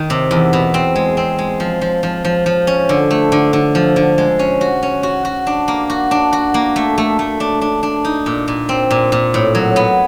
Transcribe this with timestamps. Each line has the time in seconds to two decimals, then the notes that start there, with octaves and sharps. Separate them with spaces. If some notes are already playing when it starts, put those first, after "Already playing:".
Already playing: D#3
0.10 C3
0.31 E2
0.53 B2
0.74 C4
0.96 G#3
1.17 C4
1.38 G#3
1.60 F3
1.81 F3
2.03 F3
2.25 F3
2.46 F3
2.67 C#4
2.89 D3
3.11 A3
3.32 D3
3.53 D3
3.75 F3
3.96 D3
4.18 G#3
4.39 C#4
4.61 F#4
4.83 C#4
5.03 F#4
5.25 F#4
5.47 D4
5.68 A#3
5.90 F#4
6.11 D4
6.33 F#4
6.54 A#3
6.76 A3
6.98 A3
7.19 A3
7.40 D4
7.61 D4
7.83 D4
8.05 D#4
8.26 A#2
8.48 A#2
8.69 C4
8.91 A#2
9.12 A#2
9.34 A2
9.55 F#3
9.76 B3